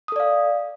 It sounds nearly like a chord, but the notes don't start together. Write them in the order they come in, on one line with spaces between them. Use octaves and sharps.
D#6 A4 D5 F5